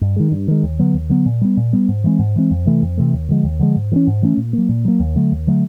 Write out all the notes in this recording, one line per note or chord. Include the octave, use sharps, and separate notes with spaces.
G2
D#3 G#3
G2
D#3 G#3
D#2
D3 F#3 B3
D#2
D3 F#3 B3
A#2
G3 B3
A#2
G3 B3
G#2
E3 G#3 C4
G#2
E3 G#3 C4
F2
C3 E3 A3
F2
C3 E3 A3
D#2
D3 F3 G#3
D#2
D3 F3 G#3
G#2
E3 A3 C#4
G#2
E3 A3 C#4
A#2
F#3 A#3
A#2
F#3 A#3
D#2
D3 F#3 A3
D#2
D3 F#3 A3